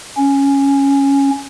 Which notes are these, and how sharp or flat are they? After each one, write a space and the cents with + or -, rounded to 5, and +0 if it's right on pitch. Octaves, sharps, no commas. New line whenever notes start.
C#4 +0